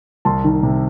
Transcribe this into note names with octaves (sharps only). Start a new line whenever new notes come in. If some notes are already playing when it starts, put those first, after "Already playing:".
C2 A5 C6
D#3
C3